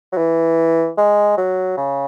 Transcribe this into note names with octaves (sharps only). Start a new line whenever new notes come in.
F#3
E3
G#3
F#3
C#3